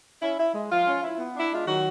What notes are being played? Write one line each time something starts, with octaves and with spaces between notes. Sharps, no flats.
C#4 E4
E4
G#3
F3 F4
C#4
E4
B3
D4 E4
G#3 F4
D#3 F#3 F#4